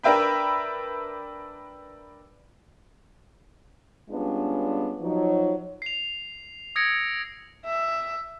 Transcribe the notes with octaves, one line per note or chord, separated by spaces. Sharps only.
D4 A#4 B4 E5 G5 B5
G3 G#3 B3 C#4 D4 F4
F3 F#3 D#4
C7 F7
D#6 E6 G#6 A#6 C#7 D7
E5